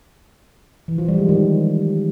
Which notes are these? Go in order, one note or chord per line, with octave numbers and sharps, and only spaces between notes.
E3
F3
G3
G#3
D#3